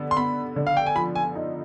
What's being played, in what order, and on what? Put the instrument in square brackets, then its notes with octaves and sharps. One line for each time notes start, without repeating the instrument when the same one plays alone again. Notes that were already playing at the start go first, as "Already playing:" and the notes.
Already playing: [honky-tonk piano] D3 B3
[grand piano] C6
[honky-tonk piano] B3 [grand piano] B5
[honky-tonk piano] D3
[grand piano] F5
G5
G#5
[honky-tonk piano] F3 [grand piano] B5
[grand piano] G#5
[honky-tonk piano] D#4